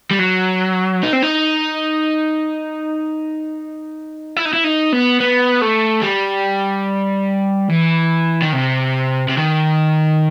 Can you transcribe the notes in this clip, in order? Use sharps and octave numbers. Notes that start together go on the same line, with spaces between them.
G3
F#3
D#4
C4
D#4
E4
D#4
E4
D#4
B3
B3
A3
G3
E3
D#3
C3
C3
D#3